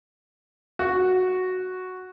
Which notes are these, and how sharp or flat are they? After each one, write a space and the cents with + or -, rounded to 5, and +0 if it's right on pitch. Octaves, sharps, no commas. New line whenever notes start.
F#4 -5